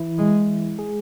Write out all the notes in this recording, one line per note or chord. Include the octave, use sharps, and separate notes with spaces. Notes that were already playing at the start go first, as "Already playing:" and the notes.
Already playing: E3 E4
G#3
G#3 G#4